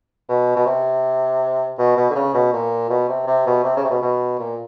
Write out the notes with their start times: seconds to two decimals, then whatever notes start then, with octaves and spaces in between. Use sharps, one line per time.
0.29 B2
0.56 B2
0.66 C3
1.78 B2
1.97 B2
2.10 D3
2.15 C#3
2.34 B2
2.53 A#2
2.90 B2
3.09 C3
3.27 C3
3.47 B2
3.64 C3
3.77 C#3
3.84 C3
3.90 B2
4.02 B2
4.39 A#2